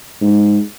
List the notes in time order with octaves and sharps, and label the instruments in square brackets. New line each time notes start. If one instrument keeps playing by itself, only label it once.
[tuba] G#2